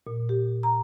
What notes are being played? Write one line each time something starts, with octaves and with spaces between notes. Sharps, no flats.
A#2
G4
A#5